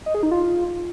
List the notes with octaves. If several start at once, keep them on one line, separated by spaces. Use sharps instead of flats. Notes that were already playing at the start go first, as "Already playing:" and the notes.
D#5
G#4
D#4
F4